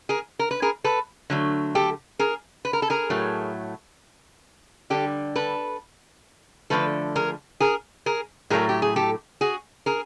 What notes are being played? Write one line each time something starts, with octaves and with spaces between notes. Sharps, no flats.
G#4 A#4
A#4
B4
G#4 A#4
A4 B4
D3 F#3 A3
G4 A4
G#4 A#4
B4
A#4
A4
G#4 A#4
A2 F#3 A3
D3 G3 G4 A4
A4 B4
D3 F3 A3 A4 B4
G#4 A#4
G#4 A#4
G#4 A#4
A2 F#3 A3 G#4 A#4
G4
G#4
G4 A4
F#4 G#4
G#4 A#4